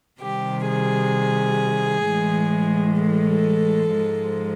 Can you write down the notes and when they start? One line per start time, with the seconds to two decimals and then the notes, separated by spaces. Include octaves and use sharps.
0.21 C3 D#3 G3 G4
0.67 G#4
2.07 A2 E3 G#3
3.01 A4
3.95 G#2 F3 G#3